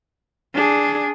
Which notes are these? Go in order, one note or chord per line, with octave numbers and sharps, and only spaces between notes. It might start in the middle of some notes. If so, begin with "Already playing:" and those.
D4 G#4